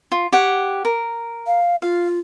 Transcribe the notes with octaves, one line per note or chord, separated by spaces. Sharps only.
F4
G4 C#5 F#5
A#4
F5
F4 F5